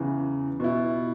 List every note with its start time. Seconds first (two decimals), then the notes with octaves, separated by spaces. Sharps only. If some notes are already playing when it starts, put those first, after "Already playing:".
Already playing: E2 C#3 E3
0.60 B2 B3 E4